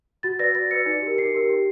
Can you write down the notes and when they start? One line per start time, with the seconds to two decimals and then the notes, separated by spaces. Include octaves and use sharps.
0.23 F#4 A6
0.39 B4 D5 A#6
0.55 F#4 A6
0.71 B4 D5 C#7
0.86 D#4
1.02 G4 A#4
1.18 D#4 C7
1.34 G4 A#4
1.49 G4